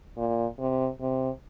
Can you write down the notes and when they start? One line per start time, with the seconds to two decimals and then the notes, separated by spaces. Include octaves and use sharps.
0.17 A#2
0.59 C3
1.00 C3